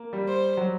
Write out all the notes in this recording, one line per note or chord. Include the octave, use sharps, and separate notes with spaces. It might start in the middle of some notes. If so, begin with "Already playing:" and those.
Already playing: A#3
G3
C5
F#3